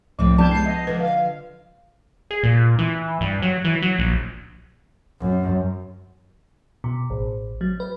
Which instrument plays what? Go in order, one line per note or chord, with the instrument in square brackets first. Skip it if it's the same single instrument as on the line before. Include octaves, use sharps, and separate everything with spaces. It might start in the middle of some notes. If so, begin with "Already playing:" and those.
[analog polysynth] C2 [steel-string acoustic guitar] A2 C4 [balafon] F3
[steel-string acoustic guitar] G3 B3 D4 [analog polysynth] A5 G6 G#6
[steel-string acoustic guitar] G#3 B3 [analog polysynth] C7
[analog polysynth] D#5
[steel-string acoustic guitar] D3 F3 [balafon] B4
[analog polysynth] F5
[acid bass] G#4
A#2
E3
G2
F#3
E3
F#3
A#1
[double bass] F#2
[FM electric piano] B2
A1
F#3
B4